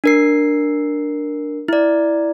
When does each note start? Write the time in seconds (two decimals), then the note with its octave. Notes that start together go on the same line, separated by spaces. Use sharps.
0.04 D4 A#4 C7
1.68 E4 D5